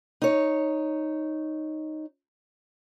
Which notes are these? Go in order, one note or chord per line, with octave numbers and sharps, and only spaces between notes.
D#4 C#5